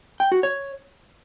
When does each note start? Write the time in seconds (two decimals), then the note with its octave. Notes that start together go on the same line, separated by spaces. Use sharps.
0.20 G5
0.32 F#4
0.43 C#5